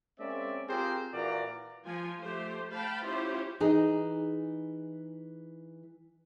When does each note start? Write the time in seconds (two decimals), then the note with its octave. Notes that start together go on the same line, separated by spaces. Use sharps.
0.19 G#3 A#3 C4 C#4 D5 E5
0.68 C4 F4 G4 G#4 A#4 C5
1.14 A#2 E3 A#3 F#4 D5 A#5
1.86 F3 F4 G#5
2.20 A3 G4 C5
2.71 F5 G5 A5 B5
3.04 C#4 E4 F4 G4 C5
3.60 E3 D#4 G#4